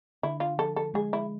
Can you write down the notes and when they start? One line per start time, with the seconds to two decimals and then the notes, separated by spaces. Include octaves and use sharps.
0.23 D3 E4
0.40 F4
0.58 F3 A4
0.76 A4
0.94 G#3 G#4
1.13 E4